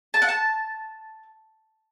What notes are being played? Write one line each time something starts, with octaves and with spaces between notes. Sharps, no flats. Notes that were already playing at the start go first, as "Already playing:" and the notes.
A5
F#5
A5